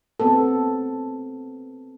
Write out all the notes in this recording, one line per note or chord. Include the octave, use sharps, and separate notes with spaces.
B3 C4 A4